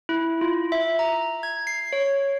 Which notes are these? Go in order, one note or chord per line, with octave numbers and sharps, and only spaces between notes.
E4
F4
E5
A#5
G#6
C7
C#5